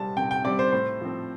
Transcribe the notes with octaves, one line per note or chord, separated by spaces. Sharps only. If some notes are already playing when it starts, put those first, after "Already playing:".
Already playing: C3 G3 C4 A5
C3 G5
G5
G3 C4 D5
C5
A2 C5
F3 C4